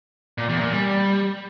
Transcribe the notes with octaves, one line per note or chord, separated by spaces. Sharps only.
A#2
E2
A#2
G3